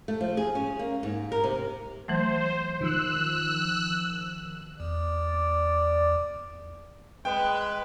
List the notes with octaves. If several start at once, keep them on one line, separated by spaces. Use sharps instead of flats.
A3
F3
G#4
C#4
A#3
G#2
A#4
C3
E3 F#3 A3 C5
D#3 F3 E6 F#6
E2 D5
G#3 B4 G5